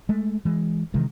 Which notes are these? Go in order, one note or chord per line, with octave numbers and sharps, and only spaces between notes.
G#3 A3
E3 G#3
C3 D#3 E3 G#3